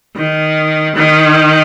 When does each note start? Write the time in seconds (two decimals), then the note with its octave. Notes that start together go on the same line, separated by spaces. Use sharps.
0.15 D#3
0.95 D#3